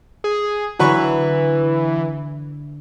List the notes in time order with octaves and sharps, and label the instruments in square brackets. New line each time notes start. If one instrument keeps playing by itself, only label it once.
[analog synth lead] G#4
[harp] D3 D4 [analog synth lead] E3 [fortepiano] F#3 B4 C#6